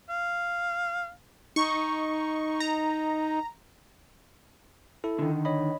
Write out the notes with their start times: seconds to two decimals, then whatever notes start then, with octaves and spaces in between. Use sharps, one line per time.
0.09 F5
1.56 D#4 C#6
2.60 A#5
5.04 E4 A4
5.19 D3 D#3
5.45 C#5 D#5 B5